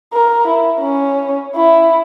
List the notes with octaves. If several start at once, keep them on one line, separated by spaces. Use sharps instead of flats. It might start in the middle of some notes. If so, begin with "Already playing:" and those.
A#4
E4
C#4
E4